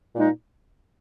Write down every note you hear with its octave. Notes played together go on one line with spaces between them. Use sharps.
A#2 G#3 D#4